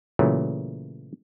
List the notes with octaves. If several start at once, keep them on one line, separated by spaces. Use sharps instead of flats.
A#2 C#3 E3 F#3 A3